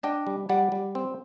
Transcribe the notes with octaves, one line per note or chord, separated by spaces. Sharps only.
D4 D#5 G5
G3
G3 D5 F#5
G3
C4